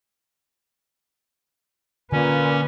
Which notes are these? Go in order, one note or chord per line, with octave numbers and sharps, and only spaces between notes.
A#2 D3 A#3 C#4 B4